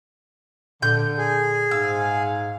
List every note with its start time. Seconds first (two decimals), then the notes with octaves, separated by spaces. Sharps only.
0.82 A#2 D3 G6
1.17 G#4
1.71 G#2 F5 E6